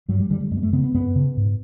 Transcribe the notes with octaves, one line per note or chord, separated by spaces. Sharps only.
G2 F#3
G3
D3 G3
G3
F#2 G#3
A#3
A3
C#3 B3
B3
F#2 B3
C#3
G#2